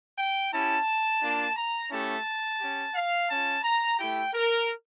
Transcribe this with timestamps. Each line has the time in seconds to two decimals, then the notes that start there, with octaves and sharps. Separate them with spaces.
0.19 G5
0.53 C#4 E4 G4 A5
1.22 A#3 D4 F4
1.57 A#5
1.91 A3 C#4 E4 G4 A5
2.60 C#4 G4
2.95 F5
3.30 C#4 F4 A5
3.64 A#5
3.98 A3 E4 G4 G5
4.34 A#4